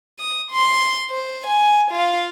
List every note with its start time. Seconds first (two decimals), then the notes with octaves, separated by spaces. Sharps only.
0.19 D#6
0.51 C6
1.10 C5
1.46 G#5
1.91 F4 F5